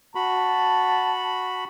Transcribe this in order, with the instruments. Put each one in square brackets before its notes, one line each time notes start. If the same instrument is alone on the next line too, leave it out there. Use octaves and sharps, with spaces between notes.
[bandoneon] F#4 B5 [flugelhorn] A5